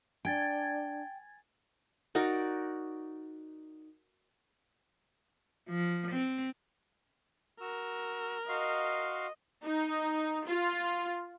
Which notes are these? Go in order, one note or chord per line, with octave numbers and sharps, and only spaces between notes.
D4 G5 G#5 G#6 A6
D#4 F#4 A#4 D5
F3
C4
F#4 A#4 E6
F#4 D#5 F5 C6
D#4
F4